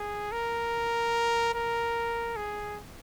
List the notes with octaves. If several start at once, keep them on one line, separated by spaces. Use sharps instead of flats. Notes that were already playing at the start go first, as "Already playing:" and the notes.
Already playing: G#4
A#4
A#4
G#4